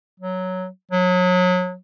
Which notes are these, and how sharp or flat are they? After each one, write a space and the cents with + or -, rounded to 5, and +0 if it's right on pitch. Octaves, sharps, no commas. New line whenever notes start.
F#3 +0
F#3 -30